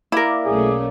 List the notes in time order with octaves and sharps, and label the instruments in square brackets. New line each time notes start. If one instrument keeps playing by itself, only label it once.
[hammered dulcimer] A#3 D5 [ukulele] E4 A#4
[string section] B1 A3 C#4 [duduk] G#4